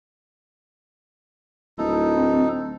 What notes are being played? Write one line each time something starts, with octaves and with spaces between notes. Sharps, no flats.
D1 D#4 E4 A4
C4